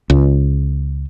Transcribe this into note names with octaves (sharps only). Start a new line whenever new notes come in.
C#2